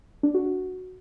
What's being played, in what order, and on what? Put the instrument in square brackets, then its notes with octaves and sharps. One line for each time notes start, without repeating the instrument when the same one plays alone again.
[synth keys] D4
F#4
F#4